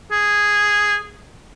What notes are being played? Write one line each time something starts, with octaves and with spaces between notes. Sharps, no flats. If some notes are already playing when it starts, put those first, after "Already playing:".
G#4